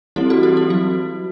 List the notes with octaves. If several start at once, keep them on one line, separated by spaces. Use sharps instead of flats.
E3 G3 C4 E4 G4
F#4 A4
E4 G4
E4
F#3 F#4